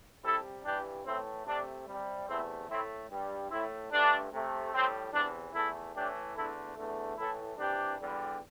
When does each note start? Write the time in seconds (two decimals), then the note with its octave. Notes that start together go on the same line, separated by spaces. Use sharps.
0.23 C3 G3 E4 A4
0.64 G2 E3 G3 D4 G4
1.05 A2 E3 A3 C4 E4
1.46 C3 A3 D4
1.87 C3 G3
2.27 E2 C3 A3 C4 E4
2.68 A2 A3 C4 E4
3.09 G2 G3
3.50 A2 A3 C4 E4
3.91 G2 D3 A3 D4
4.32 C3 A3
4.73 A2 G3 C4
5.13 E2 C3 E3 D4
5.54 E2 E3 A3 E4 A4
5.95 A2 E3 A3 D4 G4
6.35 E2 D3 A3 E4 A4
6.76 E2 D3 A3
7.17 A2 E3 A3 E4 A4
7.58 C3 E3 G3 D4 G4
7.99 E2 D3 G3